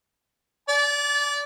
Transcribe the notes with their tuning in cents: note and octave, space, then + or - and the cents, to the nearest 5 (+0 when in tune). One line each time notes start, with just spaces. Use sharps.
D5 -20 A5 -40